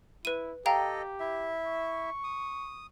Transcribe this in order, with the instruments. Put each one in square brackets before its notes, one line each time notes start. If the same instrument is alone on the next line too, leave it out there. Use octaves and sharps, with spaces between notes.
[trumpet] E4 [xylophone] B4 D#7
[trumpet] G4 [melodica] A4 D#5 [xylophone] F5 G5 A#5
[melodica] E4 E5
[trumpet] C#6
[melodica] D#6